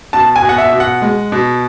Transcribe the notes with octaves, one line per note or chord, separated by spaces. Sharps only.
B2 A5
G#5
B2
F#5
E5
B2
F#5
G#3
B2